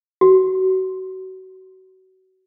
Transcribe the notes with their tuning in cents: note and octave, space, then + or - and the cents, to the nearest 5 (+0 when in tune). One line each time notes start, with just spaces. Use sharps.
F#4 +25